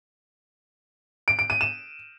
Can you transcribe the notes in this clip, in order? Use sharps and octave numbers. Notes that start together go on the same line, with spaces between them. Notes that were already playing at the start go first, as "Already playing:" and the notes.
D7
D7
D#7
E7